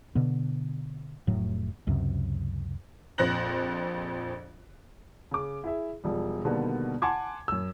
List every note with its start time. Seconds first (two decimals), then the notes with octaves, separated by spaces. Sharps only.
0.15 B2 D3 B3
1.27 F1 A2 F#3
1.87 C#2 F#2 C3
3.18 A#1 F2 C5 F#6 A#6 F#7
5.31 C#3 D6
5.64 E4 G#4 E5
6.04 E1 F3 G3
6.45 B2 D3 D#3 G3 A#3 B3
7.02 F#5 G#5 A5 C6 D6 G#6
7.48 F#2 E6